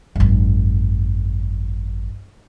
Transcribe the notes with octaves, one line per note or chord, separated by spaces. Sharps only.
G#1 F#2